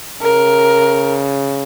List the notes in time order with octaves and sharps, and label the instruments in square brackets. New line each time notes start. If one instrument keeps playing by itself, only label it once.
[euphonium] C#3 [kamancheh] A#4